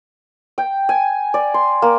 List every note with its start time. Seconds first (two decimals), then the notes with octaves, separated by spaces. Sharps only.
0.58 G5
0.89 G#5
1.34 D5
1.54 C6
1.82 A#3